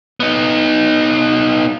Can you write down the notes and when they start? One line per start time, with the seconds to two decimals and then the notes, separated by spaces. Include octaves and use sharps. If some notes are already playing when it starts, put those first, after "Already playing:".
0.20 B3 D#4